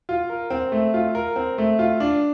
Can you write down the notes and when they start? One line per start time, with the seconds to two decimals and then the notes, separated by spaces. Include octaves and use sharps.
0.09 F4
0.30 A#4
0.50 C4
0.72 A3
0.94 F4
1.15 A#4
1.36 C4
1.58 A3
1.79 F4
2.00 D4